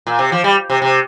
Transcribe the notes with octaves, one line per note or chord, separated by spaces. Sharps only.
A#2
C3
F3
G3
C3
C3